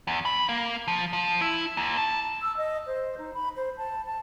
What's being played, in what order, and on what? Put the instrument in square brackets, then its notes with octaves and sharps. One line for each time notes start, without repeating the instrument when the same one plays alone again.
[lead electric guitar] E2
B5
A#3
F3
F3
E4
D#2
A5
[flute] E6
D#5
C5
D#4
B5
C5
A5
A5